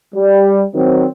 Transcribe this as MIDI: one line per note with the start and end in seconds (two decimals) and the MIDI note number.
0.14 0.64 55
0.74 1.05 51
0.74 1.05 54
0.74 1.05 60